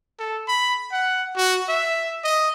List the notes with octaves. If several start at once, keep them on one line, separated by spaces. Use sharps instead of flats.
A4
B5
F#5
F#4
E5
D#5